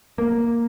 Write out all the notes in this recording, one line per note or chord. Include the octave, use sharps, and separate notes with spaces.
A#3